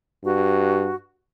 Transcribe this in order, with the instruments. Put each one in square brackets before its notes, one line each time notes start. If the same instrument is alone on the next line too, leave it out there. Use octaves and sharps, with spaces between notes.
[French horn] G2 [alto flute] F#4